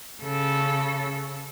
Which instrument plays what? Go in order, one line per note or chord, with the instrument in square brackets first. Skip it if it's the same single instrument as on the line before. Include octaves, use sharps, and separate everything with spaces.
[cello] C#3 A4